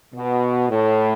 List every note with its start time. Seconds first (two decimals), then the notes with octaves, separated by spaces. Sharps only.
0.14 B2
0.70 A2